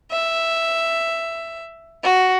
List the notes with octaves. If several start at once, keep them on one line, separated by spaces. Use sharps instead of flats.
E5
F#4